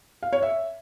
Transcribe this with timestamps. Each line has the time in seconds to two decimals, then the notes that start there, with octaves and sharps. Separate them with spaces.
0.23 F5
0.33 C#5
0.42 E5